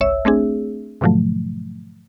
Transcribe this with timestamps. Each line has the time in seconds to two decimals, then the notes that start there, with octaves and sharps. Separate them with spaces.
0.01 G1 C2 C#5 E5 E6
0.25 A3 C4 D4 G#4
1.01 G#2 B2 D3 F3 F#3 A3